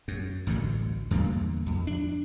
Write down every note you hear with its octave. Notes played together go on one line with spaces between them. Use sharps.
F#2
A1 D2 G2 D3
E2 G2 D3 A#3
F2
D4